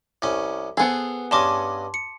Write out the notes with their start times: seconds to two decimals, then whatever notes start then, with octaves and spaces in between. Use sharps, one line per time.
0.22 C2 C#4
0.77 B3 G#4 A4 C5
1.31 G2 C#4 D#5 A5 C6 D6
1.94 C#7